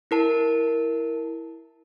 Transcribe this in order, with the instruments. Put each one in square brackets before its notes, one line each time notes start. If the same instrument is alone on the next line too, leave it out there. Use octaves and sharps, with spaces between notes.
[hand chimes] E4 A#4 A5